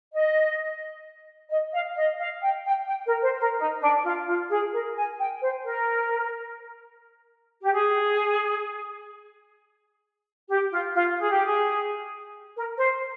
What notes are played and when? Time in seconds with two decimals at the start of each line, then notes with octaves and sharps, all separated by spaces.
0.12 D#5
1.49 D#5
1.72 F5
1.96 D#5
2.19 F5
2.41 G5
2.65 G5
2.87 G5
3.06 A#4
3.22 C5
3.39 A#4
3.58 D#4
3.80 D4
4.04 F4
4.26 F4
4.49 G#4
4.72 A#4
4.95 G#5
5.19 G5
5.41 C5
5.64 A#4
7.62 G4
7.72 G#4
10.48 G4
10.72 F4
10.95 F4
11.18 G#4
11.31 G4
11.44 G#4
12.55 A#4
12.78 C5